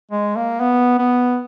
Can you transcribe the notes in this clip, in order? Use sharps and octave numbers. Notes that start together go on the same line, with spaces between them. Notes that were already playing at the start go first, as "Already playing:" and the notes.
G#3
A#3
B3
B3